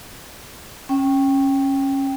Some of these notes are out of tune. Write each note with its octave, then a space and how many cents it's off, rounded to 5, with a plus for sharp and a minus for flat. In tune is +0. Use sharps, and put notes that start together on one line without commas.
C#4 -15 G5 +0